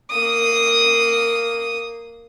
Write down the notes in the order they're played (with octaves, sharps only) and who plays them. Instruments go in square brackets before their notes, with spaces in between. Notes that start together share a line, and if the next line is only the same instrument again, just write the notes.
[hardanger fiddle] A#3 D#6